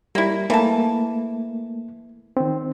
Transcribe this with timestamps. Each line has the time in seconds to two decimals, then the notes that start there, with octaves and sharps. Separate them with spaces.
0.15 G3 A#3 E4
0.50 E3 A3 A#3 A5
2.37 D#3 C4